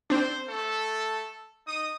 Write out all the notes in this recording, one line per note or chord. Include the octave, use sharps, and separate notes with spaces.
C4 D4 C5
A3 A4
D#4 D#6